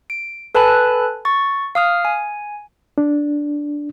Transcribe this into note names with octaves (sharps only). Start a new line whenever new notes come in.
D7
A4 B4 G#5 A5 B5 F#6
C#6 A6
F5 D#6 F6
G#5
D4